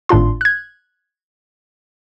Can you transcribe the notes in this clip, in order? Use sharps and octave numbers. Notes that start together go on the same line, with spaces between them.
G#1 A2 D4 F4 C6
F#6 G#6